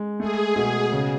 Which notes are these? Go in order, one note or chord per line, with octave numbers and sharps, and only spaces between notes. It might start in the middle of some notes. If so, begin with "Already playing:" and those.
Already playing: G#3
A3 G#4
B2
C#3